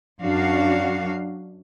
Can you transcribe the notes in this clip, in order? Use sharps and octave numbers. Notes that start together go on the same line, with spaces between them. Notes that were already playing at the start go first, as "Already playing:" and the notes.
F#2 D4 F#4 F5